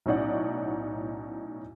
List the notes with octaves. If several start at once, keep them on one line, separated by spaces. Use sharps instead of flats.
B1 A2 C#4 D#4 D5 F#5